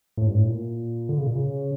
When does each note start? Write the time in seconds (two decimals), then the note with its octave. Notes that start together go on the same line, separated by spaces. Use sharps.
0.17 A2
0.27 G2
0.35 A2
0.48 A#2
1.09 D3
1.18 C#3
1.27 A#2
1.35 C#3